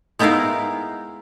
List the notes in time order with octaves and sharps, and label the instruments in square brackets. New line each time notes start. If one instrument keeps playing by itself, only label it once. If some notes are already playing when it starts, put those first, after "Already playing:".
[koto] G#3 B3 D#4 E4 A#4 F5